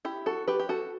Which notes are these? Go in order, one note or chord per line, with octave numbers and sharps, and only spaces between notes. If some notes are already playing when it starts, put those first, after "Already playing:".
E4 G4
F#4 A4
G4 B4
G4
F#4 A4